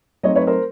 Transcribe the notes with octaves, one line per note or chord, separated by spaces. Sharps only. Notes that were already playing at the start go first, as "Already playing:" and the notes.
F#3 A3 C4 D#4 C#5 D#5
B4 C#5
A#4 C5